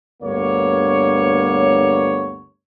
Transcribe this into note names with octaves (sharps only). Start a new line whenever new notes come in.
D2 G2 A#3 B3 C#5